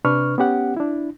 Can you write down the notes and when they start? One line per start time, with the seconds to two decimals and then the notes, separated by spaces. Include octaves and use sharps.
0.05 C3 D4 B4 C#6 F6
0.38 B3 C#4 G4 F#5
0.77 D4 E4